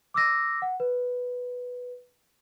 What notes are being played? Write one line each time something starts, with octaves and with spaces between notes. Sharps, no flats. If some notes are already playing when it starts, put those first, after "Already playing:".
D6 E6 A#6
F#5
B4